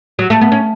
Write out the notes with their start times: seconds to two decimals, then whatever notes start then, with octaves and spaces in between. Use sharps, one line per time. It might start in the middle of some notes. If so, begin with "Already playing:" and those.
0.19 F#3
0.30 A3
0.41 B3
0.52 C#4